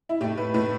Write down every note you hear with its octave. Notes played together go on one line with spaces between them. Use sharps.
E4
A2 A3 G4
B4
A2 A3 B4